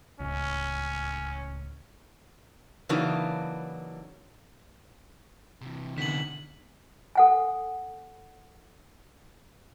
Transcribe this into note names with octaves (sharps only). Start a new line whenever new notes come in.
D1 C#2 C#4
C#3 E3 F#3 A#3 D4 D#4
C3 E3
B2 D3 D#3 B6 F#7
A4 F#5 G#5